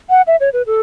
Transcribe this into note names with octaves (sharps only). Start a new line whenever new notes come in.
F#5
E5
C#5
B4
A4